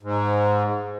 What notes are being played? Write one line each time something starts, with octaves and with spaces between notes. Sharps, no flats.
G#2